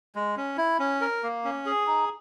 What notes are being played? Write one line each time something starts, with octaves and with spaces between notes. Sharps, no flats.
G#3
C#4
E4
C#4
A#4
A#3
C#4
G#4
D#4